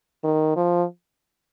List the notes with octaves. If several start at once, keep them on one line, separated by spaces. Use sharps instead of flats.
D#3
F3